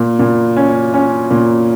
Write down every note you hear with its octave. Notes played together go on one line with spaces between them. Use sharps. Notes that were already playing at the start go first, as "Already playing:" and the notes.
Already playing: A#2
A#2
C#4
C#4
A#2